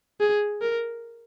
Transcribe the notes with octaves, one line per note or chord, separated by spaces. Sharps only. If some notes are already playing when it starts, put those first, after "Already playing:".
G#4
A#4